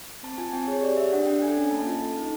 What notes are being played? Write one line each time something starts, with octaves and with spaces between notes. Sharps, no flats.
C4 A5
F4 G#5
C4 G5
G#4 C#5
G4 D5
G4 E5
D4 F#5
D4 G5
A4 G#5
C#4
A#3 A5
F4
A4
D#4